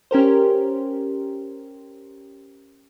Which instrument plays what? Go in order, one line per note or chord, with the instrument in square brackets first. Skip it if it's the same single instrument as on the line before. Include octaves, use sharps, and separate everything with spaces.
[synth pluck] C#4 G4 A#4 C5